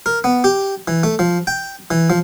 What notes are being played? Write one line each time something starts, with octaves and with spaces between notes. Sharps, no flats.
A#4
B3
G4
E3
A3
F3
G5
E3
F3